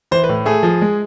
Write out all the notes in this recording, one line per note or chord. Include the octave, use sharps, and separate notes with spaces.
E3 C5
B4
A2
A3 G#4
F3
G#3